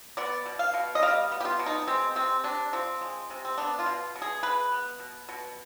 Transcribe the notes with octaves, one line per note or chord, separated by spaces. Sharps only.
B3 D5
B2
F5
B2
D#5
G3 F5
B3
G4
F4
B2
D#4
G#3 C4
C3 C4
C3 D4
F3 C4
G#3
C3
C4
B3 D4
F4
B2
B2
G#4
G#3 B4
B3
B2
B2